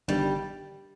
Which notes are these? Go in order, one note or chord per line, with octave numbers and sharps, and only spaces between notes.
G1 G2 D#3 G3